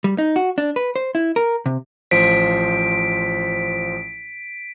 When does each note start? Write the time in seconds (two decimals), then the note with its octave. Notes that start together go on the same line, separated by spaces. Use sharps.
0.04 G3
0.18 D#4
0.36 F#4
0.58 D4
0.76 B4
0.96 C5
1.15 E4
1.36 A#4
1.66 C3
2.11 A1 F3 C5 B6 D7